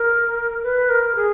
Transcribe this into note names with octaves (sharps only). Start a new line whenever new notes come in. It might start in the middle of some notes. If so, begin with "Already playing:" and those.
Already playing: A#4
B4
A#4
G#4